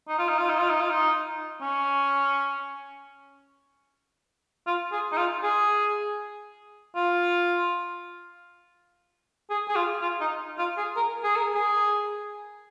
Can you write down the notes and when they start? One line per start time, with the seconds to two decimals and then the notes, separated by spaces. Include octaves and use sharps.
0.08 D#4
0.19 F4
0.29 D#4
0.39 F4
0.50 D#4
0.59 F4
0.70 D#4
0.81 F4
0.90 D#4
1.61 C#4
4.67 F4
4.92 G#4
5.12 D#4
5.17 F4
5.43 G#4
6.96 F4
9.50 G#4
9.68 G#4
9.75 F4
10.02 F4
10.21 D#4
10.58 F4
10.77 G#4
10.96 A#4
11.24 G#4
11.36 A#4
11.54 G#4